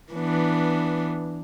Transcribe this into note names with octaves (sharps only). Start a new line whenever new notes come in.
E3 B3 D4